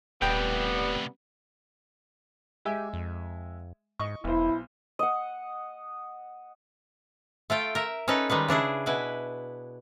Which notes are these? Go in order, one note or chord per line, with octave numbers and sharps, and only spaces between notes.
D#1 A2 C3 G3 B3 G5
G#3 G4 E5 G#5
F2
G#2 D#5 C#6
E1 B1 E4 C5
D#5 F#5
A3 F4 G5
A#4 E5
C#4 D#4 A4 B4
D#3 G3 G#3 B4
C#3 D4 E4 G#4
B2 E4 B4 G#5